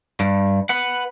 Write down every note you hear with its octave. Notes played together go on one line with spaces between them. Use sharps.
G2
B4 F#5